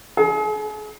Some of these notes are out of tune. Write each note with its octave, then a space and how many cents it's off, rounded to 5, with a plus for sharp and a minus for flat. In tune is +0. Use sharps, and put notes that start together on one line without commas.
G#4 +40